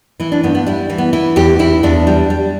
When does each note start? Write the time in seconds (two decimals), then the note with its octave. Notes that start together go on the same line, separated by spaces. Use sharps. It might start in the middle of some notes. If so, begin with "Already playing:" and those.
0.20 E3 E4
0.32 D4
0.43 G2 B3
0.55 B3
0.66 G3 E4
0.90 E3
0.98 B3
1.13 E3 E4
1.36 E2 G4
1.59 E2 E4
1.83 E2 D4
2.07 G3
2.30 G3